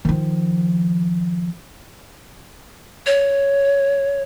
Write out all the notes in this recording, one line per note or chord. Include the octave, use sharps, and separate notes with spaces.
D#3 F3
C#5